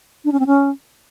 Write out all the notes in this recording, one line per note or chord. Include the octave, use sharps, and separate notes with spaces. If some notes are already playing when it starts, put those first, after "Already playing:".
D4
C#4
C4
C#4